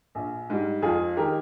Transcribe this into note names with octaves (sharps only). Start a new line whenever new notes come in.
A#1
G#2 G3
F2 F4 G#4
D#3 G#3 G4 A#4